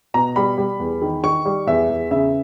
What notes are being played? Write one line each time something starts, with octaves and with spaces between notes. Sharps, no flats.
B2 A#5
G3 B5
G3
E2
D#3
D#3 C#6
G3
E2 E5
E2
C#3 E5